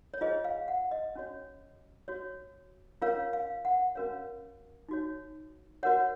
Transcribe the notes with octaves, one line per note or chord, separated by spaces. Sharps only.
C#5
F4 G#4 C5 D#5
F5
F#5
D#5
C#4 F#4 C#5
F#4 C#5
C#4 F4 A#4 C#5 F5
F5
F#5
C#4 F#4 A#4 C#5 F5
D#4 F#4 C#5
F#4 A#4 C#5 F#5